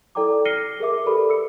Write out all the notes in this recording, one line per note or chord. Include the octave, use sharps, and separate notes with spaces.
E4 A4 D5 G5 A#5 D6
F6 A#6 C7 C#7 D#7 G7
G#4 A#4 E5 D6
G4 A4 B4 D5 B5
E6 C#7